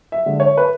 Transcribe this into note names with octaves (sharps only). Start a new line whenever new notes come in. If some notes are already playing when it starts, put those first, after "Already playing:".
E5
D3 G#3
C#5
B4